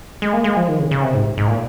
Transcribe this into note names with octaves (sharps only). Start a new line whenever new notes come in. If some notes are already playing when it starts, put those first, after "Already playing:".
G#3
A#3
G#3
F3
D#3
C#3
C#3
C3
G#2
G#2
A#2